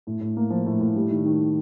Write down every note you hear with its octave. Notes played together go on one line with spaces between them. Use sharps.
A2
A2
A#3
F3
A2
A2
G3
D#3
D#3